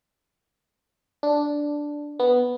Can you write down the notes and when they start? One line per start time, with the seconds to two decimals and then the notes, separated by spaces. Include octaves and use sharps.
1.23 D4
2.19 B3